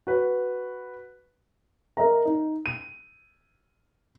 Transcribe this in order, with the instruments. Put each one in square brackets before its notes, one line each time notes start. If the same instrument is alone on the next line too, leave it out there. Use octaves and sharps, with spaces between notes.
[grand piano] F#4 B4
[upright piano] A#4 D#5 E5 A#5
D#4
D#7